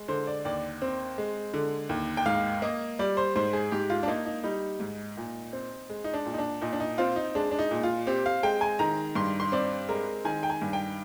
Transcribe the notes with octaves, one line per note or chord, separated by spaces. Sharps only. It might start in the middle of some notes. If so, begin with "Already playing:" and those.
Already playing: G#3
D3 C5
D5
D#2 D5
C4
G#3
D3
D#2
G5
G#2 F5
A#3 D#5
G3 D5
C5
G#2 C5
G#4
G#2 G4
F4
D4
A#3 D#4
D#4
G3 D#4
G#2
A#2
C4
G#3
D#4
D4
A#2
D#4
D4
A#2 D#4
D4
D#4
C4 F4
D#4
G#3 D4
D4
D#4
A#2
F4
C4 G4
F5
G#3 G5
G#5
D#3 A#5
G2 C6
C6
C4 D5
G#3 A#4
D#3 G#5
G5
G#5
G2
G5